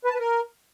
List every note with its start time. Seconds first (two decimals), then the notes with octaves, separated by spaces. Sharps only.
0.04 B4
0.09 A5
0.14 B4
0.19 A#4